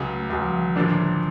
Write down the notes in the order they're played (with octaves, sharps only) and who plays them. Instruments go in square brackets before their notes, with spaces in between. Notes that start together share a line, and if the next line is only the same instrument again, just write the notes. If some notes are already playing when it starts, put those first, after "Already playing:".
Already playing: [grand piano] C#2 C#3 F#3
[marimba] A3
[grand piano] C#2 C#3 F#3 [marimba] G3
[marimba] F3
E3
D#3
[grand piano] A1 A2 F3 A#3 D4 [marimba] D3